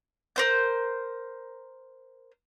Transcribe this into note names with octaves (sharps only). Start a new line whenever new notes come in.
A#4 C5 G6